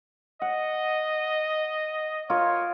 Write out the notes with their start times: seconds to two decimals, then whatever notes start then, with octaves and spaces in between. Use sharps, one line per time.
0.42 D#5 F#5
2.30 F4 A#4 C#5 D#5